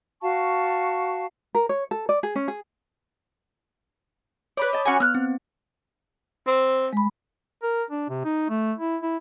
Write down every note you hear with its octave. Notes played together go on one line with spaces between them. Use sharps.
F#4 F5 A5 C#6
A#4
C#5
A4
D5
G#4
C#4
G#4
B4 C#5 D5 B5 D6
D#5 A5
C#4 F#4 G#5
B3 F6 F#6
C4
C4
G#3 B5
A#4
D4
C3
D#4
A3
E4
E4